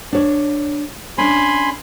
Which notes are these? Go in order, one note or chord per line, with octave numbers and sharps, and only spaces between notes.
D4 C#5
C#4 D4 G#5 B5 C6